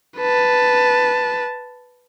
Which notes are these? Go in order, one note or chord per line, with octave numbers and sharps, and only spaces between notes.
B4 A5